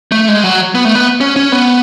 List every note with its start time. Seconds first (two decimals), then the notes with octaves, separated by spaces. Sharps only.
0.12 A3
0.28 G#3
0.44 F#3
0.75 B3
0.85 A3
0.95 B3
1.21 C#4
1.36 C#4
1.52 B3